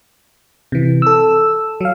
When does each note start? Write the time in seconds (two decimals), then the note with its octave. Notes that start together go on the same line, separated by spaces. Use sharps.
0.72 C3 E3
1.02 A4 E6
1.81 F#3 F5